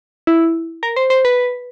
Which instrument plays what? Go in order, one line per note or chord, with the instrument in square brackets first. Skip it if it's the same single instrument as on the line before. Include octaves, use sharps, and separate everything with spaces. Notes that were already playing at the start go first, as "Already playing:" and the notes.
[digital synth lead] E4
A#4
C5
C5
B4